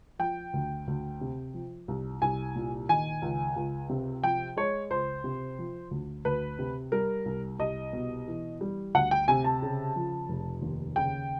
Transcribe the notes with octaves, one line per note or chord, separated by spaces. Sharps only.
F3 G5
D2
D2
C3
F3
C2
C2 G#5
A#2
D#3 G#5
C#2
C#2
C3
F3 G5
G#3 C#5
C#2 C5
C3
F3
D2
D2 B4
C3
G3 A#4
C2
C2 D#5
B2
E3
G3
D2 F#5
G5
C3 G#5
A5
C#3
F3
F1
D#2
C#3 G5